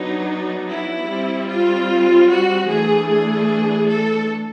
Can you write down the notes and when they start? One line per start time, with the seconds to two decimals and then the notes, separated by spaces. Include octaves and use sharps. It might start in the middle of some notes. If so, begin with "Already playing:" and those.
Already playing: F#3 B3 D4 D#4
0.69 E4
1.08 G3 C4
1.49 F4
2.29 F#4
2.68 E3 A3 D4 G#4
3.09 G#4
3.88 A4